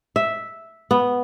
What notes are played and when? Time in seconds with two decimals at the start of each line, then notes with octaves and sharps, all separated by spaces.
0.16 E5
0.91 B3